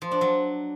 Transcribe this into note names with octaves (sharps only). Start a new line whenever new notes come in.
F3
D4
F#3